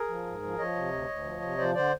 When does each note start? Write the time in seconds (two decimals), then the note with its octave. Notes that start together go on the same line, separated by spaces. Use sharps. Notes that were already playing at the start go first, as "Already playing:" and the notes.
Already playing: G#4 A#4
0.09 F3
0.26 G#2
0.43 F3
0.59 F3 C#5 D#5
0.75 C3
0.92 D2
1.09 D2
1.25 F3
1.42 C3
1.58 F3 C5 D5
1.74 D3 C5 D5